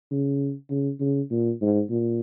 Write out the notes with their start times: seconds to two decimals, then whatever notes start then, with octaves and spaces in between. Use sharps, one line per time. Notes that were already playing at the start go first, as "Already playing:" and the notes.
0.11 C#3
0.70 C#3
1.00 C#3
1.31 A#2
1.61 G#2
1.90 A#2